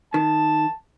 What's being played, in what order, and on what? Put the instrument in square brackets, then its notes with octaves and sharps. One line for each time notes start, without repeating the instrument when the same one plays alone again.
[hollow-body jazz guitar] D#3 [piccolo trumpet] A5